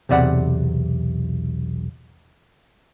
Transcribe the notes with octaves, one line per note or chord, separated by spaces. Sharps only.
B1 E2 C3 D5 F#5 B5